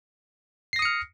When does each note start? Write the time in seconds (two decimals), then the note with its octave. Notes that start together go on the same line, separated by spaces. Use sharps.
0.73 C7
0.76 A#6
0.79 D#6
0.82 C#7
0.85 F6